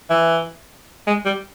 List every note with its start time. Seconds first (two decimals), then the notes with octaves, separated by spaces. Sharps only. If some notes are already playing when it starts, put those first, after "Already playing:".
0.10 E3
1.07 G#3
1.25 G3